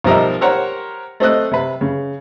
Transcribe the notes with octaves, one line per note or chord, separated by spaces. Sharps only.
B1 F3 G3 A#4 D#5 E5
G4 A#4 C5 C#5 F#5
A3 C4 D#5 F#6
C3 B4
C#3